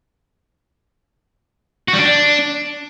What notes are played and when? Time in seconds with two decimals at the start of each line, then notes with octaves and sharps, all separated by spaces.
1.88 F#4
1.94 G3
1.99 D4